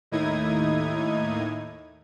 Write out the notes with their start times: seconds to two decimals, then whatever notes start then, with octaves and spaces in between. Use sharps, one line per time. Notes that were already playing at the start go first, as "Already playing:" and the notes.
0.11 D#2 A2 D#4 E4 D#6 G#6